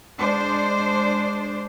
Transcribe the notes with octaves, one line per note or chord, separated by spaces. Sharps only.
G#3 D4 C5